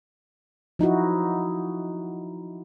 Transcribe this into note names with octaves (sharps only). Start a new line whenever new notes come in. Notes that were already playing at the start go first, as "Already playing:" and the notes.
F3 D#4 E4 F#4